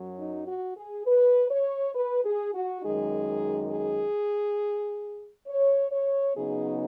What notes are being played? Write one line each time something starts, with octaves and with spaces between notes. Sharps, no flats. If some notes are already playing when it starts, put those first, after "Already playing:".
Already playing: F#2 F#3
D#4
F#4
G#4
B4
C#5
B4
G#4
F#4
F#2 D#3 G#3 D#4 G#4
G#4
C#5
C#5
C#3 F#3 B3 D#4 G#4